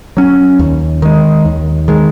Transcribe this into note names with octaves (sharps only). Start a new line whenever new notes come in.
F#3 C#4
D#2
D#3 G#3
D#2
D#3 G#3